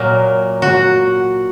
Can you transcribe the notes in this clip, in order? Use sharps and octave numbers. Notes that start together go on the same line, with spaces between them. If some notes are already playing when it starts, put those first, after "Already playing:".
Already playing: A#2 F#3 A#3
F#4